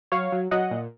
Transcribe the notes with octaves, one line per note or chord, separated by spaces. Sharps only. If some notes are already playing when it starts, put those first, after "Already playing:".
F#3 C#5 F5
F#3
F#3 D#5 F#5
A#2